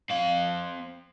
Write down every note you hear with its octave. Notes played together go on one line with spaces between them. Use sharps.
C4 F5